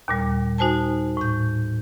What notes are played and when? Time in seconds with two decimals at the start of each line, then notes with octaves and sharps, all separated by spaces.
0.08 D#2 A#2 G3
0.58 D#4 F#4 C5 G#5 A5
1.17 A2 G6